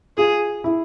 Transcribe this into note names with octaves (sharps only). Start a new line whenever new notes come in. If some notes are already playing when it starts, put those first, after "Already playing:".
F4 G#4
E4